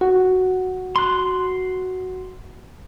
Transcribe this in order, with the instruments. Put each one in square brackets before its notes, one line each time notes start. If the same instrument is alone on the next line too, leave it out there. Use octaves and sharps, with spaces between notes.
[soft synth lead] F#4
[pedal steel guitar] C6 F#6